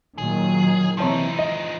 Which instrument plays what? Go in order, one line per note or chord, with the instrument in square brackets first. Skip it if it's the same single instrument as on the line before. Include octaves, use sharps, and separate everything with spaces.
[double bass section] A#2 D#3 F#3 [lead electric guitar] G#4
[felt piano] C3 C#5 A5 [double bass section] E3 [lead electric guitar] F3 D#4
[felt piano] D#5